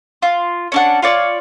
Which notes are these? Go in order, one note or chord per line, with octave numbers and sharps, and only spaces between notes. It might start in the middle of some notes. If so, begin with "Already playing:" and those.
F4
C#4 D4 F#5
F4 C#5 D5